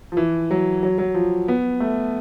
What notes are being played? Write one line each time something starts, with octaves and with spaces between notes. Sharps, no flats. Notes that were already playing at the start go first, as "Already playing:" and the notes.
F3
E3
F#3
F#3
F#3
F3
B3
A3